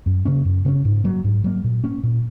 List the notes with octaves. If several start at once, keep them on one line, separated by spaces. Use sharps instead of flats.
F#2
C#3 A#3 C#4
F#2
C#3 A#3 C#4
G#2
F#3 A#3
G#2
F#3 A#3
A#2
A#3 C#4
A#2